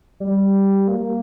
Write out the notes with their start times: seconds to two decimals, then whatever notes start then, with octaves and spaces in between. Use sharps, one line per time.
0.20 G3
0.88 A#3